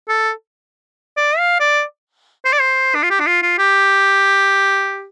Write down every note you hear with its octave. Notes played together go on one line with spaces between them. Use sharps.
A4
D5
F5
D5
C5
D5
C5
D4
F4
G4
D4
F4
F4
G4